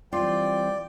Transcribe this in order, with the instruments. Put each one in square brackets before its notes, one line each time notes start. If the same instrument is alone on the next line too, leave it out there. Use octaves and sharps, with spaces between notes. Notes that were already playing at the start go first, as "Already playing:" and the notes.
[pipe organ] E3 G3 C4 [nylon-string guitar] F4 [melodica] D5 [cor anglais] G5